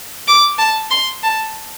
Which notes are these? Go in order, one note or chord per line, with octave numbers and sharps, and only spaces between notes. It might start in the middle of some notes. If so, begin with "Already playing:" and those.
D6
A5
C6
A5